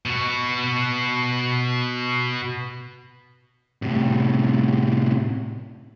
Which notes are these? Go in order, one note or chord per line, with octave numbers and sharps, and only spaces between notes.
B2 F#4
A2 C3